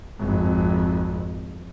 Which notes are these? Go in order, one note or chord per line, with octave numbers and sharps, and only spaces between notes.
G#1 F2